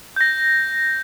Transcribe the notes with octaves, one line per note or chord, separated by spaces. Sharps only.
G6 A#6